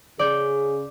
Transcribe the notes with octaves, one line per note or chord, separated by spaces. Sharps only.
C#3 G#4 D5 G6